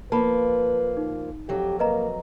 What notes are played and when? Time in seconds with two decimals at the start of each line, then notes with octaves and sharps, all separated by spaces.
0.12 F3 A#3 B4 A5 B5
0.97 D#4
1.49 F2 F#3 G4
1.79 A#3 B4 D#5 A#5